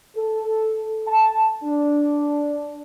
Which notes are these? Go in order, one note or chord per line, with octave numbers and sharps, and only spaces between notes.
A4
A5
D4